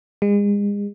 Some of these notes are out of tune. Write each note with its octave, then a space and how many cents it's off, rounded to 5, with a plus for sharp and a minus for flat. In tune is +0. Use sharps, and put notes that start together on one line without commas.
G#3 -35